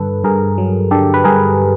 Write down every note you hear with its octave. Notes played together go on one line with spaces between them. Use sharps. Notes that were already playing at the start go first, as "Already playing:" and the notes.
Already playing: G2 D3 A4 B4
G2 G#4 A#4
F#3
D3 G4 A4
B4
G2 G#4 A#4